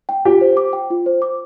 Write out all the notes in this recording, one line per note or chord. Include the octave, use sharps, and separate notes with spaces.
G5
F4 G4
C5
D6
G5
F4
C5
D6